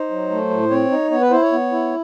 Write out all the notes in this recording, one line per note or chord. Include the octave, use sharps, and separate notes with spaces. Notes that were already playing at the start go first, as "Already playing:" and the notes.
Already playing: D#4 C5
F#3
A3
A2
C4 C#5
D#4
B3 C#5
B4
E4 C5
C#5
B3
E4